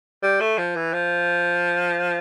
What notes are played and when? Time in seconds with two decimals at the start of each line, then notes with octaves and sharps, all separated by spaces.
0.23 G3
0.41 A3
0.58 F3
0.76 E3
0.93 F3